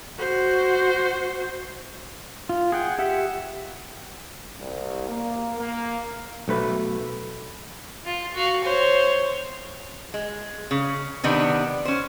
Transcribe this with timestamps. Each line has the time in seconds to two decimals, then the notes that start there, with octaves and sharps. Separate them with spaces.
0.19 F#4 C5
2.49 F4
2.72 G#4 F#5 G5
2.99 G4 E5 F#5
4.59 C2
5.08 A#3
5.59 A#3
6.48 B1 A3 B4
8.05 F4
8.34 F#4 F5
8.64 C5 C#5
10.14 G#3
10.71 C#3
11.23 C3 D#3 B3 D4
11.85 C#4 C5